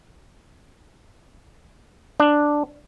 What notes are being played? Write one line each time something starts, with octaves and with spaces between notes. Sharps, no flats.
D4